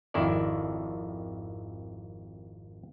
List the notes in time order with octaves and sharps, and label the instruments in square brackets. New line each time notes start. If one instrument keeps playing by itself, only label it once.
[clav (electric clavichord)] G#1 F2 D#3 E4 A4 D5